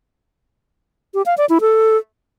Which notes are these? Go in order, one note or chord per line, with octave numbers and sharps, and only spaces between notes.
G4
F5
D5
E4
A4